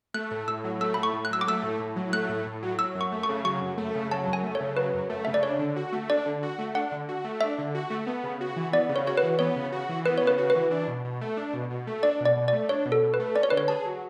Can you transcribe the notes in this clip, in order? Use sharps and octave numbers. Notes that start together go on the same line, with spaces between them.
A3 F#6
A2
A2 E6
F#3
A3 E6
A2 B5
C#6
A2
F#6
F#3 E6
D6
A3 E6
A2
A2
F#3
A3 F#6
A2
A2
F#3
F#3 E6
F#2
C#6
A3
C#6
C#3
F#3 C#6
F#2
A3
C#3
F#3 A5
F#2
G#5
A3
C#5
C#3
F#3 B4
F#2
A3
C#3 E5
D5
D4 C#5
D3
F#4
A3
D4 D5
D3
F#4
A3
D4 F#5
D3
F#4
A3
D4 E5
D3
F#4
A3
B3
C#3
F#4
E3
B3 D5
C#3
C#5
F#4 C#5
B4
E3
B3 C#5
C#3
F#4
E3
B3 B4
C#3 C#5
B4
F#4
B4
E3
D4
B2
B2
A3
D4
B2
B2
A3
D4 D5
B2 D5
B2
D5
A3
D4 C#5
B2
A4
B2
B4
A3
C#4 D5
C#5
D3 B4
C#5
G#4 A5
F#3